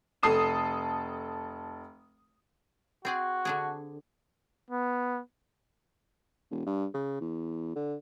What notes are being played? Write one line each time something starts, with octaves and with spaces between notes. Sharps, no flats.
F1 A4 D#6 C7 E7
C4 F#4 G#4 D5
D3 D4 G#4
B3
E1
G2
C#3
E2
D3